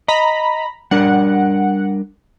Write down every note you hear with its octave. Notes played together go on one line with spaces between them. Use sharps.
D#5 A#5 B5
G3 D4 A#4 F#5